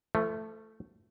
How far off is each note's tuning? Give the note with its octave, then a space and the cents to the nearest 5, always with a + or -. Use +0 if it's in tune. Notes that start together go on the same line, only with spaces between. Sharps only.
F3 -40 A3 +0